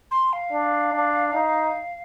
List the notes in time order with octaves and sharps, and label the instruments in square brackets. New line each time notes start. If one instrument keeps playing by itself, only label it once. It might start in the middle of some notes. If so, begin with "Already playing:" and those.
[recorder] C6
F5
[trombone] D4
D4
D#4